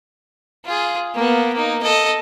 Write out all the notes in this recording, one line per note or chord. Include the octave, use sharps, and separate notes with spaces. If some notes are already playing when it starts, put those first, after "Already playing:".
F4 G#4
A#3 B3
A#3 D#4
A4 D#5